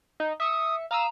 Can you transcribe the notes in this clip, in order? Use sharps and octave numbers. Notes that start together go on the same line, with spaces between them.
D#4
E5 D#6 C#7
F5 A#5 D#6 E6